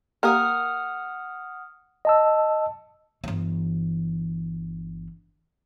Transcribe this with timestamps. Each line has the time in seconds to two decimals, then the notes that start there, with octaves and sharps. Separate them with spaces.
0.23 A#3 G4 A#4 F#5 D#6 F6
2.05 D#5 A5 E6
3.24 G1 E3